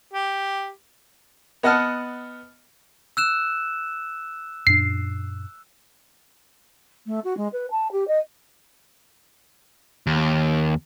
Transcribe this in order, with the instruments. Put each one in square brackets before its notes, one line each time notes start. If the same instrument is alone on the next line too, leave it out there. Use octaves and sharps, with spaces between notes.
[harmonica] G4
[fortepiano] B3 D#5 F#5 A5 F6
[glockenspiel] E6 F#6 E7
[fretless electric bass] F#2 A#2 D4 [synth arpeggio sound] C7
[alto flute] A3
F#4
G#3
B4
A5
G4
D#5
[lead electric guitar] D#2